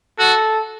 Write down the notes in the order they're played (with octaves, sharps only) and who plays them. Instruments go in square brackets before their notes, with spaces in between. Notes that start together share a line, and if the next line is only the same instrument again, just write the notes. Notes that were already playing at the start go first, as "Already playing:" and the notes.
[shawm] F#4 [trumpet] A4